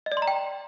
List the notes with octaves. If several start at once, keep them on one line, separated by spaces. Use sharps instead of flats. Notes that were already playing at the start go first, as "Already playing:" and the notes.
D#5
D5
C6
A#5
G5